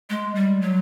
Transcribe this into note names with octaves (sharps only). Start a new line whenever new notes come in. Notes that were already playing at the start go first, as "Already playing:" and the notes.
G#3
G3
F#3